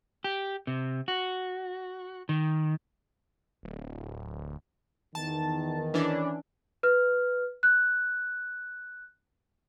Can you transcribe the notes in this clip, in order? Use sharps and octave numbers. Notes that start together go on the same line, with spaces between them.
G4
C3
F#4
D#3
D1
E2 D#3 A5
E3 C#4 D4
B4 F6
F#6